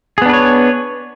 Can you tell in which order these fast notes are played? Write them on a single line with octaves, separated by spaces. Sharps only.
G#4 B3 D4 B4 C#5